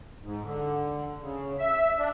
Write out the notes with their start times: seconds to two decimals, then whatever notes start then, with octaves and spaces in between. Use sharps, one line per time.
0.23 G#2
0.44 D3
1.22 C#3
1.59 E5
1.98 D4